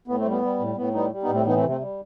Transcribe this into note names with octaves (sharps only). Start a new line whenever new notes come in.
A2 B3
A3 C4
G3
B3
G3
A2
A2 B3
G3 B3 D#4
G3
B3 D#4
A2
A3 C4
E3 B3 D#4
A3 C4
C3
A3 C4
G3